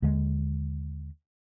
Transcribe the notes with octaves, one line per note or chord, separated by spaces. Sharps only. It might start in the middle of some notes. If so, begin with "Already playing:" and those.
D#2 D3 G#3